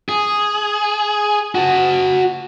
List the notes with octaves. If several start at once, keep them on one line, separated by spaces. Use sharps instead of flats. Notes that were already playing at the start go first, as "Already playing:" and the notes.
G#4
F#4 A5